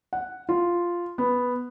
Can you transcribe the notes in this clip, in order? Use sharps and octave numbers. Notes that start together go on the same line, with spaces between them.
F#5
F4
B3